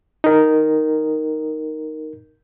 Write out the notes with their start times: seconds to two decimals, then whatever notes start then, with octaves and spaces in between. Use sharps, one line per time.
0.24 D#4 A#4